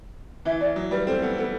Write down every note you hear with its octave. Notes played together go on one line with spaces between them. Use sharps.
E3 E5
E3 D5
F#3
G3 B4
C4 A4
B3
B3